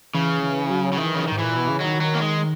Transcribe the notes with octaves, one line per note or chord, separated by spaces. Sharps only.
C#3 E3
E3
F#3
C#3
D#3 E3
C#3
G#2 D#3
A#2 E3
B2
C#3
D#3 F#3
F#3
A#3
G#3